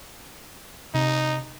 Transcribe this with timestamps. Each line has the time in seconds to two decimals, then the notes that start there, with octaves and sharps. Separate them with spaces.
0.94 C3 D#4